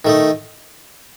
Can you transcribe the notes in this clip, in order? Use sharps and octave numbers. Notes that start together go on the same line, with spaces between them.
D#3 A3 D#4